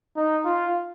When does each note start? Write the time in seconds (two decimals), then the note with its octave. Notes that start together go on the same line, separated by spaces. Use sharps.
0.16 D#4
0.45 F4